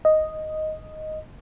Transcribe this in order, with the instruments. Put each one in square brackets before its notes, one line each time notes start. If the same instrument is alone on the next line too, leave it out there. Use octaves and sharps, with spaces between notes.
[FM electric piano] D#5